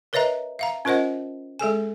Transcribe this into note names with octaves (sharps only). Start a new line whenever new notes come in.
A#4 B4 C#5 D#5 E5 A#5
E5 F5 A#5
C#4 F4 A#4 C5 D#5 F#5
G#3 G#4 A4 G#5